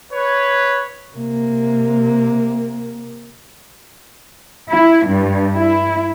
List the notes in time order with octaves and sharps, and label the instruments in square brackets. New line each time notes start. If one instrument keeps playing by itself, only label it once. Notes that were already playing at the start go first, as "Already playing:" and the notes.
[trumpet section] B4 C#5
[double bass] C3 A#3
[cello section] E4
G2
E4